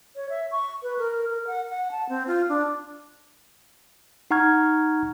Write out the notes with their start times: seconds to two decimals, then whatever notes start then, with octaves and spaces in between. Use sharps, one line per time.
0.16 C#5
0.30 E5
0.52 C#6
0.83 B4
0.98 A#4
1.30 A#4
1.47 F#5
1.69 F#5
1.91 A5
2.09 C4
2.27 F4
2.49 D4
4.31 D#4 F#5 A#5 C#6 F6 G#6